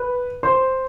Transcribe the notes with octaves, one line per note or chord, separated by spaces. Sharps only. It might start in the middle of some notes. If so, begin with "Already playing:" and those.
Already playing: B4
C5 C6